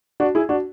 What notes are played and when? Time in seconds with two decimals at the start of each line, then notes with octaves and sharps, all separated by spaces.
0.20 D4 F#4
0.35 E4 G#4
0.49 D4 F#4